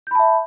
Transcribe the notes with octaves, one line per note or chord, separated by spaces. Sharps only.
E5 A5 B5 G6